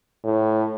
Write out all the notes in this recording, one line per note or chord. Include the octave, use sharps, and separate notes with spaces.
A2